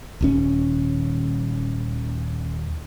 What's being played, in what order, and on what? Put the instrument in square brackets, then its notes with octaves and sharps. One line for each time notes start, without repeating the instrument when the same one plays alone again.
[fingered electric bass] D#1 D#2 C#4